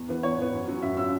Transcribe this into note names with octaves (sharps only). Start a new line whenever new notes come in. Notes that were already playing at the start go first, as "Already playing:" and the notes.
Already playing: E2
E3 B3
E2 C#5
E3 B3
F#2
F#3 C#4
F#2 E5
F#3 C#4 E6